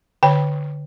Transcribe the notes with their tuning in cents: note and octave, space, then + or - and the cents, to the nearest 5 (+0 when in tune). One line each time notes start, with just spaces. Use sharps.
D3 +0 C#5 +10 G5 +0